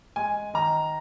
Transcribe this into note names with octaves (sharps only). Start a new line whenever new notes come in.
G#3 G#5
D#3 A#5